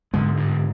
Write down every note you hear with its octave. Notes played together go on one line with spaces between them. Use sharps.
G#2 D3 G#3
G2